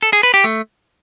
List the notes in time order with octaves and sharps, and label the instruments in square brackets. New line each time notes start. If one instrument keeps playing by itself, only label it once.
[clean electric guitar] A4
G#4
B4
G4
A3